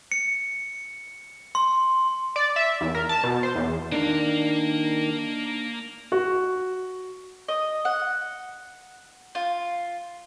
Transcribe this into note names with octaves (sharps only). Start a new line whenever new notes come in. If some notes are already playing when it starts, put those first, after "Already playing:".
C#7
C6
D5
E5
E2
A#4
A5
B2
C5
E2
D#3 A#3 D4 F5
F#4
D#5
F#5
F4